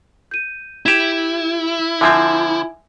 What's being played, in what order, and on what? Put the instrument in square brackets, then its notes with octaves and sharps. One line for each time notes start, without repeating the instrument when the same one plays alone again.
[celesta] G6 D#7
[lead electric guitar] E4 [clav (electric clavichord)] G4 E5 [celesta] G#6 E7
[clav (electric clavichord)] D3 F3 C4 [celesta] E5 G#5 G#6